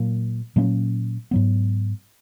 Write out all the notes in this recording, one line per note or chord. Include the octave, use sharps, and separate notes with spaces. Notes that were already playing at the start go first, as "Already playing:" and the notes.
Already playing: A#2 F#3 A#3
A#2 F#3 A#3 C#4
G#2 F#3 B3